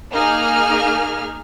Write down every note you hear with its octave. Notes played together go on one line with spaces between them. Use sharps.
A#3 D#4 G#4 F6